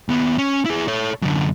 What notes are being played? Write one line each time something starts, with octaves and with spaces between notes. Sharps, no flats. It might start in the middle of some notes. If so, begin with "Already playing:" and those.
D#2 B3
C#4
E4 G#4
A4 C#5
F#2 D3